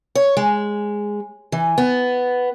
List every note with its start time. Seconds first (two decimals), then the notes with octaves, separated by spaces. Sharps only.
0.15 C#5
0.37 G#3
1.52 E3
1.78 B3